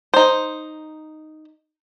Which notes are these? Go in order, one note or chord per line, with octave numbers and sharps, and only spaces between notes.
D#4 C5